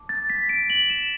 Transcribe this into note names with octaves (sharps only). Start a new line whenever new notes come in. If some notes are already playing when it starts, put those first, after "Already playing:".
Already playing: A5 D6
A6
B6
D7
F#7
E7